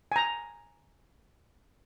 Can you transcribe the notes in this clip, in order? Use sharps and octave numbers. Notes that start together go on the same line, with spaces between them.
G#5 A#5